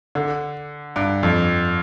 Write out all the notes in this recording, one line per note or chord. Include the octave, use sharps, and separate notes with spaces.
D3
G2
F2